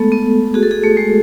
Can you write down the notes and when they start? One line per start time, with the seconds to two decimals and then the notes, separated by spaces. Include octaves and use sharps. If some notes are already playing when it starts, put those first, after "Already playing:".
Already playing: G#3 A3 B3 A4
0.12 B3
0.54 F#4 G#4
0.63 A4
0.71 G#4
0.83 A3 A4
0.97 G#3